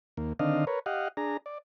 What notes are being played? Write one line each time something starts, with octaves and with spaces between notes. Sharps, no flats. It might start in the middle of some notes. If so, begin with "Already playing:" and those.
D#2 A#3
D3 D#3 C4 D4 D#5 F5
A#4 B4 C#5
G4 D#5 F5 F#5
D4 G#4 A#5
D5